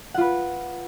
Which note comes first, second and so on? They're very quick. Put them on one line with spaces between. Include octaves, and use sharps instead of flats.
F#5 F4 B4